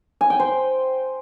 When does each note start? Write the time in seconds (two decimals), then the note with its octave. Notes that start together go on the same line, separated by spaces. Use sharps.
0.21 G#5
0.30 G5
0.40 C5